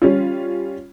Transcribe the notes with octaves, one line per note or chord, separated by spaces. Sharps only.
G3 C#4 F4